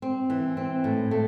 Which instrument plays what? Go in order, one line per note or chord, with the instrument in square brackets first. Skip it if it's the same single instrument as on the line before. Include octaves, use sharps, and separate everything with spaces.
[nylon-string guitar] C4
E3
C4
A2
A3